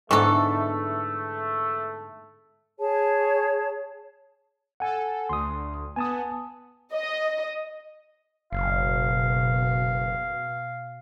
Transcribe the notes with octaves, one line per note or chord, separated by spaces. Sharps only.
G#2 D3 E3 A3 B3 A4 C#6
G#4 C#5 A5
A4 F#5 G#5
D2 C6 D#6
B3 G#5 A5 D#6
D#5
F#1 B2 F5